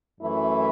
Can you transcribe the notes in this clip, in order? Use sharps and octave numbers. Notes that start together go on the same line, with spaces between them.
F#2 E3 A3 E4